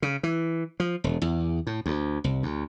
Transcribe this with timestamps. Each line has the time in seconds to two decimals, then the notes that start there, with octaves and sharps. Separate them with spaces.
0.02 C#3
0.23 E3
0.80 F3
1.04 E1
1.22 E2
1.67 A2
1.86 D2
2.24 C2
2.43 D2